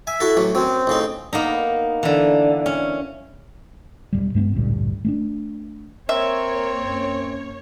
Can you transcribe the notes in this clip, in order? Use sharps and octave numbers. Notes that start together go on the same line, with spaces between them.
E5 G#5
E4 F#4 A4
A1 F#3
F#2 F#3 C4
A1 C#3 D#4
A#3 B3 D#4
D3 E3
C#4
E1 B1 G3
G2 G#3 A3 B3
A1 D2 G2 A#2
A3 A#3 D4
A#3 C4 A#4 C#5 E5
F#2